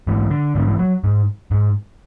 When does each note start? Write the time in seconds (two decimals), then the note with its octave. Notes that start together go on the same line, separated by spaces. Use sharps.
0.07 G#2 E3
0.30 D3
0.55 G#2 D3
0.67 E3
0.79 F#3
1.04 G#2
1.51 G#2